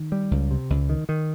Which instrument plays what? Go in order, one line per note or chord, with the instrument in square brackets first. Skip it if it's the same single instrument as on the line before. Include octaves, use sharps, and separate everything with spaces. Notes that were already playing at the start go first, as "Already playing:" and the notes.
Already playing: [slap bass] D#3
G3
C#2
C3
C#2
D#3
D#3